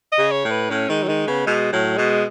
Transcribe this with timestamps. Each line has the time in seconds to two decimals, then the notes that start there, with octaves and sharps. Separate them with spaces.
0.12 D#5
0.19 C#3
0.31 C#5
0.45 A2
0.51 B4
0.70 A2 C#4
0.89 D#3 G#3
1.03 F#3
1.09 D#3 G#3
1.27 C#3 B3
1.46 B2 G#3
1.73 A2 F#3
1.97 B2 G#3